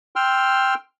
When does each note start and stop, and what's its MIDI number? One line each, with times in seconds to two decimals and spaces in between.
0.16 0.74 79
0.16 0.74 84
0.16 0.74 88
0.16 0.74 89